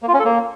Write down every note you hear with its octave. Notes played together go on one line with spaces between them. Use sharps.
A#3
F4
C#4
A4
A#3